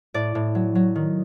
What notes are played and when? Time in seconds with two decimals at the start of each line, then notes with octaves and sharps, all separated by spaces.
0.14 A2 D5
0.35 A2
0.55 F#3
0.75 F#3
0.95 D#3